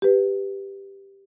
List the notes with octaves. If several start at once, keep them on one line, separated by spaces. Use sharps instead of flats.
G4 B4